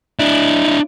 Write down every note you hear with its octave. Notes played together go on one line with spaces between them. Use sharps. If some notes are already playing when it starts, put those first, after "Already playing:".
D4 E4